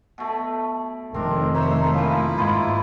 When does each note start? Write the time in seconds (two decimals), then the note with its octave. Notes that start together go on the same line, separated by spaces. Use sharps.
0.18 B2 A3
1.14 F1 D#3 A3 C4 D4 A#4
1.55 C5 C#5 E5 A#5
1.94 G2 E3 F3 A#3 E4 F5
2.38 G#2 F4 G#4 C5 B5